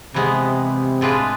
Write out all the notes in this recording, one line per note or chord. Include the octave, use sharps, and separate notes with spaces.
C3 E3 G#3 B3
A2 G#3 D4 F4 B4